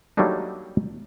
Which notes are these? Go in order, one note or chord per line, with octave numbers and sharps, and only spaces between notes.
F#3 G3 A3 A#3 D4 D#4